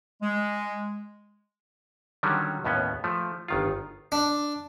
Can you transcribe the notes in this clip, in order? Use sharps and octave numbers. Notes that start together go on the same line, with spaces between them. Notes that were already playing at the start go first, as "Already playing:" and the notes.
G#3
D3 D#3 F#3 G3 C#4
D#2 A2 B3 C#4
F3 A3
G1 D#3 F4
D4